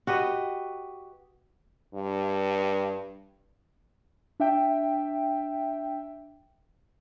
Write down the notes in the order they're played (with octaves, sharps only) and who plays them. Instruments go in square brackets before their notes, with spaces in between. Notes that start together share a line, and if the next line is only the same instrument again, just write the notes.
[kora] F#4 G4 B4 D#5
[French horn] G2
[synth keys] D4 E5 G5